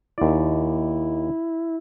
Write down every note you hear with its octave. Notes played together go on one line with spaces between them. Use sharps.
D#2 E4 D5